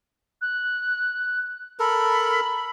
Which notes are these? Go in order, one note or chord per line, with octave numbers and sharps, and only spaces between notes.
F#6
A4 A#4 B5